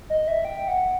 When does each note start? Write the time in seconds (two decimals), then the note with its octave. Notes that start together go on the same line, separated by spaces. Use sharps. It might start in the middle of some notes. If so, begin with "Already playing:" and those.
0.10 D#5
0.28 E5
0.45 G5
0.68 F#5